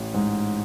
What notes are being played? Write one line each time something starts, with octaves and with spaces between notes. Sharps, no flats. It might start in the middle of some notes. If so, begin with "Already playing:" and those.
Already playing: A1
G#2